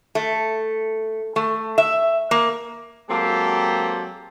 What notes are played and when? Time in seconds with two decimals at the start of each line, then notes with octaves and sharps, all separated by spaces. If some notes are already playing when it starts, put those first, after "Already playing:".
0.15 A3
1.36 A3
1.78 E5
2.31 A#3
3.10 F#3 G#3 A#3 C4 G4 A4